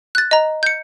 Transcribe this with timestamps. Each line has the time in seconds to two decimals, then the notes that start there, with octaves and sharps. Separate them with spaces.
0.15 F#6 A6
0.31 D#5 A#5
0.63 G6 C#7